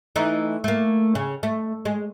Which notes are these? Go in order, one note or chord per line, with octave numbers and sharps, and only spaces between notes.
E3 A3 D#4
A3 A#3
C#3
A3
G#3